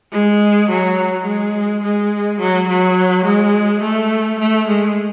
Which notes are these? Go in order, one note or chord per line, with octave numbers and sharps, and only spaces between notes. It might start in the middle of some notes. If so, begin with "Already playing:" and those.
G#3
F#3
G#3
G#3
F#3
F#3
G#3
A3
A3
G#3